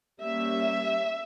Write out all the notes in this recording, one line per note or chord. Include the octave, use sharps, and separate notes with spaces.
G3 A#3 C#4 E5